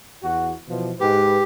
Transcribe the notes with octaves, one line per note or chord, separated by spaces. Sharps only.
E2 F#4
B2 E3 F3
G#2 G4 B4